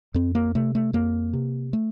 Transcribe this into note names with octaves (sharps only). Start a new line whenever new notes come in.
F2 C4
A#3
C3 A3
A3
F2 A#3
C3
A3